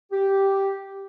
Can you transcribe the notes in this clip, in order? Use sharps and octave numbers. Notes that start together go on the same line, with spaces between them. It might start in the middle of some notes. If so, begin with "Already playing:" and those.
G4